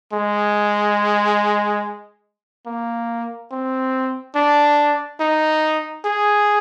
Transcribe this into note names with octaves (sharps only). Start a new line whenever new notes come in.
G#3
A#3
C4
D4
D#4
G#4